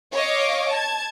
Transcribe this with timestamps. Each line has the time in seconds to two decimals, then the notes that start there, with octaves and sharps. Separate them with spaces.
0.14 C#5 D#5 F5 C#6 D6
0.71 A5 G#6